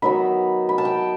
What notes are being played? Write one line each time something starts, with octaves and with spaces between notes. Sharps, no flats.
D#3 F#3 B3 D#4 B5
B5
A5
G5